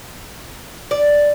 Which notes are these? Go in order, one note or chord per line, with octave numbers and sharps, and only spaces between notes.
D5